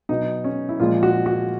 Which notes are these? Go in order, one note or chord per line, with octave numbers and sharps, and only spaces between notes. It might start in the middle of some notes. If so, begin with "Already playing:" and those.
B2 F#3 D#4
C#4
E4
A#2 F3 G#3 F4
F#4
F#4